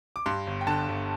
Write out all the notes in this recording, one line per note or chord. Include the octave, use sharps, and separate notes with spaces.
D6
G2 C6
G1
G5
D3 A5
G1